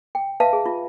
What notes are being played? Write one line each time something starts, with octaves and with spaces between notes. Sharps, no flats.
G5
B4 E5 F5 A5
G#4
F4